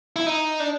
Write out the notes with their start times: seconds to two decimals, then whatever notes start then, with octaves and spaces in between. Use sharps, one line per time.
0.16 E4
0.26 D#4
0.60 D4